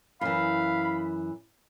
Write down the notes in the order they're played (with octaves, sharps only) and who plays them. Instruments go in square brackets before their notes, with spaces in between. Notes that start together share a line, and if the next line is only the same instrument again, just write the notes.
[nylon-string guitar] F#2 E3 [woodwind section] F5 B5